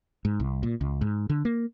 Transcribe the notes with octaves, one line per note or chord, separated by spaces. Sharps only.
G#2
C2
A#2
C#2
G#2
D3
A#3